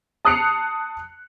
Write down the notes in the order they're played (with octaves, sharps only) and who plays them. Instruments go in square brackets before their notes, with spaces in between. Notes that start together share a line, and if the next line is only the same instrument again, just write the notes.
[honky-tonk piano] A5 D#6 F#6 C7 C#7 F7